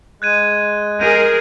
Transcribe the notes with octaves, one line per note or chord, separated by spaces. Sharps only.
G#3 F#6 G#6 D#7
G#4 A#4 G6 D#7